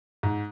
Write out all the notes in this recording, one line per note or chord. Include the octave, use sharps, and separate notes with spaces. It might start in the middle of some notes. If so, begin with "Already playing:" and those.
G#2